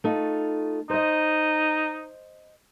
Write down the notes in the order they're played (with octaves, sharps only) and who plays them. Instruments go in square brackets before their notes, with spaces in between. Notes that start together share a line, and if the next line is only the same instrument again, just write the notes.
[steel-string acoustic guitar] A3 D#4 F4
[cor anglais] D#4 [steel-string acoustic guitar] C5 D#5